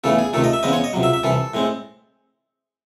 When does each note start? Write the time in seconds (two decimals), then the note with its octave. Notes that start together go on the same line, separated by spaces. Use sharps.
0.04 E2 C#3 E3 A3 A4
0.19 G#4
0.33 C#2 C3 D#3 A3 A4
0.44 D#5
0.53 E5
0.63 E2 C#3 G#3 C4 D#5
0.73 C#5
0.84 D#5
0.93 C#2 C3 F#3
1.03 E5
1.13 E5
1.23 C2 C3 E3 A4
1.54 A2 G#3 C4